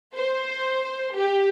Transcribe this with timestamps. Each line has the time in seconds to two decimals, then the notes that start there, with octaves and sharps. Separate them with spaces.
0.14 C5
1.15 G4